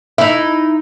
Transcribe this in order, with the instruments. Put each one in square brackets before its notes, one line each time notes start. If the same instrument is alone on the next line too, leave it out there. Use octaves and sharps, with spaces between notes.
[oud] D#4 E4 [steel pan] E5